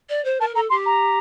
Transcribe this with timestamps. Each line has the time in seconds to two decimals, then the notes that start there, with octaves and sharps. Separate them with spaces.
0.09 D5
0.24 C5
0.40 A#4 A5
0.55 A4 A#5
0.70 G4 C6
0.86 A#5